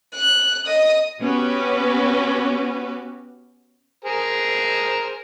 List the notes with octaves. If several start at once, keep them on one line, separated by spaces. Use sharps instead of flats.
F#6
D#5 D#6
B3 C#4 F#4 G4 B4
G#4 A#4 C5